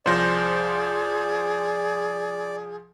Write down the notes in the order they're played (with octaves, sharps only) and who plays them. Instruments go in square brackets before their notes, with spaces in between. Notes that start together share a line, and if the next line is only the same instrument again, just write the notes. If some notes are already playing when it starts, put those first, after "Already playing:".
[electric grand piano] C2 F3 A#6 [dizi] G#4 [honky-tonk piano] C5 [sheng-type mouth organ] D5